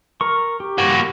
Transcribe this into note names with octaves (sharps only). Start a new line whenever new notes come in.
A#4 C#6
G4
A#3 F#4